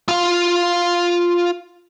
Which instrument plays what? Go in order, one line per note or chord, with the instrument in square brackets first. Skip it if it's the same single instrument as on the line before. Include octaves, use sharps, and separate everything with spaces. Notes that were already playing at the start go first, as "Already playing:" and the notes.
[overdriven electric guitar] F4 F5